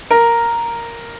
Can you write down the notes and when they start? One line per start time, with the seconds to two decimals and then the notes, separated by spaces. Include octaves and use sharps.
0.10 A#4